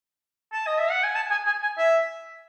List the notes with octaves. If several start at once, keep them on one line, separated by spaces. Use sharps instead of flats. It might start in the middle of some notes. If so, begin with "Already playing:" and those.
A5
D#5
E5
F#5
G#5
A5
G#5
G#5
G#5
E5